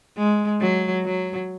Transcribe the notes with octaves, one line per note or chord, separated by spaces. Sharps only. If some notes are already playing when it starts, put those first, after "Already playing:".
G#3
F#3
F#3